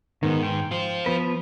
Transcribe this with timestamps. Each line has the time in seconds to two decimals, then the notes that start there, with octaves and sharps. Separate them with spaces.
0.23 G#2 D#3 B3
0.43 G5
0.71 F4 C5
1.06 F3 B3 B4